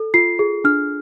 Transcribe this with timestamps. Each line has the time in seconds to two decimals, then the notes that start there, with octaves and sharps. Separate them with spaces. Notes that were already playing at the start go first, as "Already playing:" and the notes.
Already playing: A4
0.14 F4 C7
0.39 G#4
0.64 D4 F6